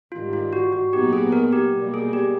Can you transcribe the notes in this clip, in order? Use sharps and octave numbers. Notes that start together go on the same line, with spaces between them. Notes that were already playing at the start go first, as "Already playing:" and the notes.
G#2 D#3 G3 F4
F4
F#4
F#4
A#2 F#3 B3 D#4 F#4 G4
G#4
A#4
G4
B2 G3 A#3
G#4
G4